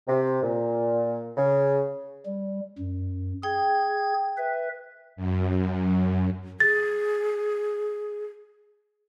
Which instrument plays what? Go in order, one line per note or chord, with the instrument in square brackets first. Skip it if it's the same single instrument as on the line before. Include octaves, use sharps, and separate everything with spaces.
[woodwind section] C3
A#2
C#3
[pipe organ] G3
F#2
[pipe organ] G#4 G#6 [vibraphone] G5
[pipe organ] B4 E5
[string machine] F#2
[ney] G#4 [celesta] A6